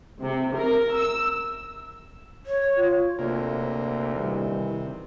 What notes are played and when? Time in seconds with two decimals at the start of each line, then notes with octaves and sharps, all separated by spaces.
0.20 C3
0.54 A#4
0.94 E6
2.46 C#5
2.77 F4
3.19 D2 C3 A#3
4.16 C3 D#3 E3 G3